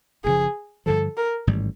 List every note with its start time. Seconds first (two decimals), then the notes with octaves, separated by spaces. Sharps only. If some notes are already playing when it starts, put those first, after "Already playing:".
0.24 F#1 F#2 C#3 F3 G#4
0.86 G2 D3 F3 A4
1.17 A#4
1.47 A1 G#2 D#3 G3